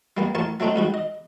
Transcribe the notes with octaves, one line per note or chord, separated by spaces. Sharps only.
G3 A#3 B3
A1 A#4 A5 C#6
F#3 A3 C4 D4 D#4
G#2 G3 F#4
D#5